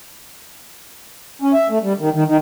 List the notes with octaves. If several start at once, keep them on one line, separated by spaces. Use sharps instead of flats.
C#4
E5
A3
G3
D#3
D#3
D#3